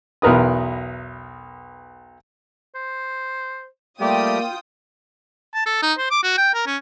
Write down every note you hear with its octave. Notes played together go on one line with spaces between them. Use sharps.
B1 E2 A#4 B4 D#6
C5
G3 A3 A#3 F4 G4 D5 G5 D#6
A5
A4
D#4
C5
D6
F#4
G5
A#4
C#4